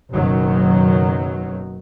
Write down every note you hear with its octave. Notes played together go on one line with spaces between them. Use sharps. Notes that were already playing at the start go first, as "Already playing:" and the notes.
F#1 F#2 B2 D#3 F#3